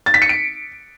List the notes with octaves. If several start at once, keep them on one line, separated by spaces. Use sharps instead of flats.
A6
B6
C#7
D7